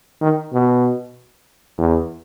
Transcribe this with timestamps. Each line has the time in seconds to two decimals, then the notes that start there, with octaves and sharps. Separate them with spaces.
0.21 D#3
0.53 B2
1.78 E2